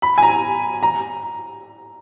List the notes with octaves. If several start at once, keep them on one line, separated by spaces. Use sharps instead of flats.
B5
G#5
A#5
A#5